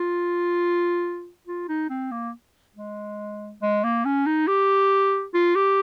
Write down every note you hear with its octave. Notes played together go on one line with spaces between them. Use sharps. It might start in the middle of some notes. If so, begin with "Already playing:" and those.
Already playing: F4
F4
D#4
C4
A#3
G#3
G#3
A#3
C#4
D#4
G4
F4
G4